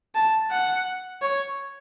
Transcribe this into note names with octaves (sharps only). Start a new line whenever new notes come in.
A5
F#5
C#5